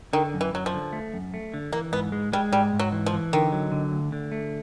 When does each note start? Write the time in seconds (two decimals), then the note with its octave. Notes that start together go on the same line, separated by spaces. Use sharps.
0.13 D3 D#3
0.34 F#2
0.41 E3
0.53 F#2 F#3
0.66 F3
0.74 D3
0.93 A3
1.14 F#2
1.34 A3
1.54 D3
1.72 E3 A#3
1.92 G#2 B3
2.12 G#3
2.33 G3 G#3
2.52 G#2 G3
2.73 G#2
2.79 F#3
2.92 E3
3.06 F3
3.13 E3
3.33 D3 D#3
3.52 F#3
3.72 D3
3.92 D2
4.12 D3
4.32 A3